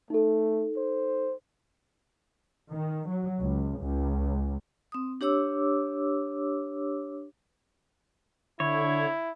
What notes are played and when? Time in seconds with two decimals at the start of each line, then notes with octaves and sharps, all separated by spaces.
0.10 A3 D#4 A4
0.77 C5
2.72 D#3
3.09 F#3
3.42 C#2
3.80 C#2
4.92 C4 D#6
5.21 D4 G4 C#5 D6 E6
8.60 D3 E4 C#5